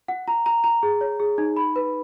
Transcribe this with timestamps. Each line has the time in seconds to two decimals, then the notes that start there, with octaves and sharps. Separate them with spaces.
0.08 F#5
0.28 A#5
0.46 A#5
0.64 A#5
0.83 G#4
1.01 C#5
1.19 G#4
1.38 D#4
1.56 B5
1.76 B4